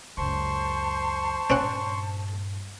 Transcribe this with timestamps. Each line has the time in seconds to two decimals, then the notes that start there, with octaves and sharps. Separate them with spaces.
0.17 C#2 F#2 C5 A5 C6 C#6
1.50 G2 A#2 C4 C#4 F#5